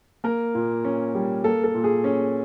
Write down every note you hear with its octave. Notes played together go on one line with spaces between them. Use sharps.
A#3 A#4
A#2
C#4
G3
A#3 A4
A4
A#2
G#4
C#4